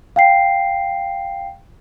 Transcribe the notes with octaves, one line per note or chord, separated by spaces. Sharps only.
F5 G5 C7